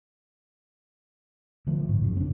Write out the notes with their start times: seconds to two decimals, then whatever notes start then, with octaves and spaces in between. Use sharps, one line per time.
1.67 D3 F3 A3
1.89 G#2
2.02 F#2 C#3
2.17 C4 D4